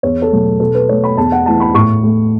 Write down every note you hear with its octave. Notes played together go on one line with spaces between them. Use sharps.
E2 C#5
A4
B2 F#3 A3
B2 A4
B4
A3 C#5
B5
E2 A5
F#5
E3 A3 A5
B5
A2 C#6
A3